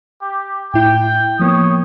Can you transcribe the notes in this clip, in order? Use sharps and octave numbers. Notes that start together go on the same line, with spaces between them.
G4
A2 E4 G5
F3 A#3 B3 C#5 D#6